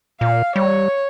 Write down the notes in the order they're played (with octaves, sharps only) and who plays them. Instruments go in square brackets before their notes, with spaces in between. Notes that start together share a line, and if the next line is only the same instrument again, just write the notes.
[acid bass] A#2 [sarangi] F5
[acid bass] G3 [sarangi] C#5